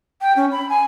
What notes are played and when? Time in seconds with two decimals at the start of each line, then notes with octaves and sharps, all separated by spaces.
0.21 G5
0.36 C#4
0.52 B5
0.69 G#5